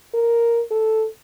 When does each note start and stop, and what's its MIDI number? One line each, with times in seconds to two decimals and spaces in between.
0.14 0.62 70
0.71 1.06 69